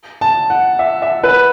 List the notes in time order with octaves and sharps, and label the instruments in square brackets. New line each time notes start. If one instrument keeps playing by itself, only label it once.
[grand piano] A5
F#5
E5
E5
B4